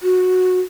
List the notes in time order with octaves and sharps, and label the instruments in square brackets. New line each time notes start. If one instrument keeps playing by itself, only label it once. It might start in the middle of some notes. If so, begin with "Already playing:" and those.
[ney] F#4